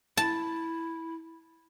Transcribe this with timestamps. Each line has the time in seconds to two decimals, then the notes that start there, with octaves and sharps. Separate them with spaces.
0.17 E4 A5